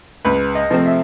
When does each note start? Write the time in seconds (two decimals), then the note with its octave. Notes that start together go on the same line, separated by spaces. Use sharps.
0.25 C#2 B4
0.55 D#5
0.70 C3 F3 A3 C4
0.86 E5